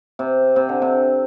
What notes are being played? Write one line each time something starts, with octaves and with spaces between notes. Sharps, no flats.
C3
C3
D3
C3